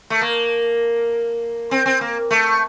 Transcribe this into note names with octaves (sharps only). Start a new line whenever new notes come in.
A3
A#3
C4
C4
A#3
A3